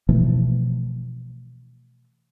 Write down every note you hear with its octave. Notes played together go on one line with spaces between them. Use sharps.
B2 E3 F3 A3